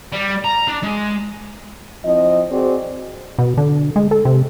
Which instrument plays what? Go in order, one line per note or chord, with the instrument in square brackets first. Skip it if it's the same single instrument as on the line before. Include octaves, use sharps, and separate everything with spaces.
[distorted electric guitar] G3
A#5
D4
G#3
[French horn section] F3 C4 E4 D#5
C4 F#4 G#4 C5 D5
[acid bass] B2
D3
G#3
A4
C3